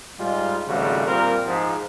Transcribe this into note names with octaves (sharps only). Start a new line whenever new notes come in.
G#2 G3 G#3 F4
G#1 C#3 F3 G3 A3 F#4
A#2 G3 C4 F4 A#4
G#2 F3